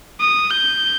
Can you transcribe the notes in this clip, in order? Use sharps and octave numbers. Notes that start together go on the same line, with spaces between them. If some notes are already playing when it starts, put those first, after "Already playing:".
D#6
G6